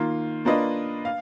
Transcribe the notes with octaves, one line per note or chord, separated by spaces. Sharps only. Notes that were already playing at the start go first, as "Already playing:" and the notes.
Already playing: D#3 A#3 F4
A#3 D4 F4 B4 D#5
F5